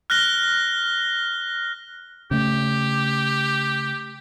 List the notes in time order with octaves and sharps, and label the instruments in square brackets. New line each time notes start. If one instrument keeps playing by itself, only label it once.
[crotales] F6 F#6 A#6 G7
[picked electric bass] C#3 A3 [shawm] G4